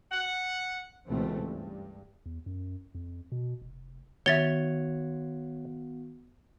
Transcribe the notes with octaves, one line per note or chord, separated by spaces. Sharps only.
F#5
C#2 B2 E3 A3 C4
G2
E2
F#2
F2
B2
F1
D#3 B3 F#4 C#5 E5 F#5 A6 G7